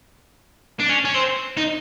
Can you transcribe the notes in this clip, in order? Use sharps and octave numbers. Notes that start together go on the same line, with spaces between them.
D4
C#4
C#4
C4
D#4